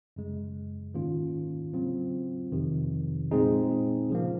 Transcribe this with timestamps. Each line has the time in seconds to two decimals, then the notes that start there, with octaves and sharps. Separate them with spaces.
0.16 F#2 C#3 G#3
0.94 G#2 D#3 A#3 C#4 F4
1.74 C#3 F#3 C4 F4
2.52 F2 C3 D#3
3.31 A#2 G#3 C4 D#4 G#4
4.10 C#3 F3 A#3